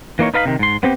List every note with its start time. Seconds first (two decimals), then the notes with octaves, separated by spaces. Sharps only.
0.19 E3 A#3 D#4 C#5
0.34 D#4 B4 F5 A#5 B5
0.45 C3 D#3
0.59 G#2 C6
0.83 B3 C4 G4